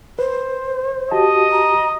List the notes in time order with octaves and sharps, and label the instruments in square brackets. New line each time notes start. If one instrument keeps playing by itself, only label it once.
[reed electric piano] B4 [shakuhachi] C5
[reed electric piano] F#4 G4 A5 [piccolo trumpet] D#5
[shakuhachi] A#5